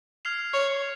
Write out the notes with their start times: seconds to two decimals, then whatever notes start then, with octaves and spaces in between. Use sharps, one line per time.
0.25 F6 G#6 C7 F7
0.54 C#5